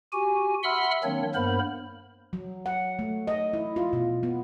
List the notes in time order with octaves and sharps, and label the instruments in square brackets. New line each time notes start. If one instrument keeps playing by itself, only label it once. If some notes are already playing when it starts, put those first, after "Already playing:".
[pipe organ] F#4 G4 G#5
E5 F#5 B5 C6 E6 F6
D#3 F#3 A#3 C4 D4 C#5
G2 A#3 B3 A#4 C5 B5
[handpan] F#3
F#5
A3
D#5
E4
F4
B2
B3